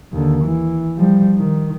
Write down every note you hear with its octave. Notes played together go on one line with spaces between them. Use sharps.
D#2 D3
E3
F3 G3
D#3